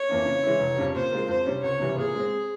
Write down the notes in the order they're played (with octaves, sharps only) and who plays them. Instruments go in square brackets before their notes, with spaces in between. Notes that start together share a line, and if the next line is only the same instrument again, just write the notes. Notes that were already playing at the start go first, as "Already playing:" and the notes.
Already playing: [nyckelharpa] C#5
[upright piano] F2 E3 A#3 C#4
C#3
E3 G#3 C#4 E4
F1
F2 C#3 G3
[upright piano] A#2 [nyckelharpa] C5
[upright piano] G#3 C4 F4 A#4
[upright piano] F2 [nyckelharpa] C5
[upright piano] C3 G3 C#4
[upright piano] C#2 [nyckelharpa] C#5
[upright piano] C3 E3 G3
[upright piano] A#2 [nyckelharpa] G#4
[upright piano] G#3 C4